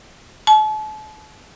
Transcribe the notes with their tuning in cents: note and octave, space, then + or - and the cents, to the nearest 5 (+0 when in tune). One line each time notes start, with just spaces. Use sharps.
A5 -40